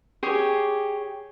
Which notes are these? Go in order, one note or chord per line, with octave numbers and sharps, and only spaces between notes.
G4 G#4 C#5